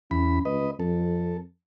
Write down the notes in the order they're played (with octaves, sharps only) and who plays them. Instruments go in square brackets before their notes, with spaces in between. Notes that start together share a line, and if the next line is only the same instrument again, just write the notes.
[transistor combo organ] E2 B5 [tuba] C#4
[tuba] C#2 [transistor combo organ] B4 D#5
[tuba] F2 [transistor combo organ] A4